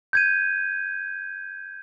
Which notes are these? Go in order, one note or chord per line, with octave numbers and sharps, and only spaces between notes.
G6 G#6 D#7